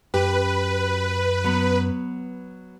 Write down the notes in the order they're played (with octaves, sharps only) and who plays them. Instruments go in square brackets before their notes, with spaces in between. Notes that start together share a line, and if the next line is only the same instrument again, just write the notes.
[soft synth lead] F#2 [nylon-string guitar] G4 [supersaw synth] B4
[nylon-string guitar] F#3 B3